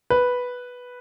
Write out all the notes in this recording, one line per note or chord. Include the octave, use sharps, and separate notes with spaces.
B4